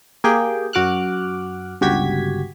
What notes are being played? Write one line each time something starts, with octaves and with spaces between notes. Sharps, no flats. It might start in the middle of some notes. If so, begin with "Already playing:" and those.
A#3 G4 G#4 G5
F#2 F#4 D6 F6 F#6
G1 C#2 F#4 G4 G#6 B6